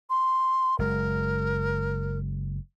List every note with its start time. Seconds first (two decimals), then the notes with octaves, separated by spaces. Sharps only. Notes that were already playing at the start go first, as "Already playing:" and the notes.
0.10 C6
0.79 F#1 G#3 A#4